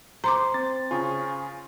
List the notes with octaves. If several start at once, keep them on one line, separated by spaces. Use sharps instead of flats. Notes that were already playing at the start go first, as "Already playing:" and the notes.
C5 A#5 C6 D6
C4 A6
C#3 F4 G#5 C#6 D#6